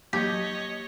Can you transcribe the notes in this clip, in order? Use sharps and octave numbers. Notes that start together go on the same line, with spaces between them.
F#3 A#3 G4 C#5 D#5